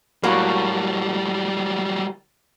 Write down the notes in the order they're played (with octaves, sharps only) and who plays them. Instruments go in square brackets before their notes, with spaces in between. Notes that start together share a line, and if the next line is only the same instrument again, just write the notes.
[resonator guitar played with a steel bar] A2 A#3 F#4 [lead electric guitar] F#3 G3